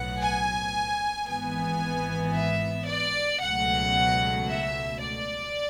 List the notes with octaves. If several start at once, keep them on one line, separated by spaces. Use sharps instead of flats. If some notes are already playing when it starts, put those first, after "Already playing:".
Already playing: B1 A2 F#3 B3 F#5
G#5
G#1 G#2 E3 B3 G#5
E5
D5
C#2 B2 F#3 A3 F#5
E5
D5